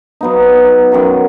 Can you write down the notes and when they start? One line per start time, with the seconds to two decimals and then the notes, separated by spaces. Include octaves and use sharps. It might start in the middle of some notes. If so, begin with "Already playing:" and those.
0.21 F#3 B3 D#4
0.92 F#2 D#3 F#3